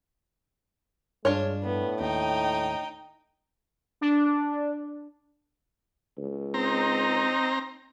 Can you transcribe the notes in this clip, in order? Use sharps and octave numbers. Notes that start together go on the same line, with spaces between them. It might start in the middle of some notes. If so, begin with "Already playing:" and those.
G2 G#3 D4 F4 C#5
A2 B3
D#2 D#4 G5
D4
C#2
C4 D#4 A#5